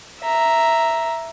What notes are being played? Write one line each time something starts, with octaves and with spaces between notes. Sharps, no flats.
E5 A#5